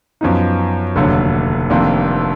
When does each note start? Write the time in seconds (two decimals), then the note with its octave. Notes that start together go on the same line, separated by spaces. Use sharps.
0.21 F#2 F3 B3 D#4
0.96 F1 D#2 D3 F#3
1.70 F1 F2 D#3 A#3 D4